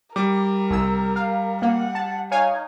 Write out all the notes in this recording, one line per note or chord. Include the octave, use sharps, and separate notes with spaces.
G3 A#4 D6
C2 E6
F5
A#3 F#5
A5
D#4 C#5 F5 G#5